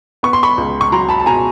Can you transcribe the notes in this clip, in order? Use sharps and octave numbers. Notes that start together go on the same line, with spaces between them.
B3 C#6
C6
B5 C#6
C#2
C#6
F#3 A#5 C6
A5 B5
A5
B2 G#5 A#5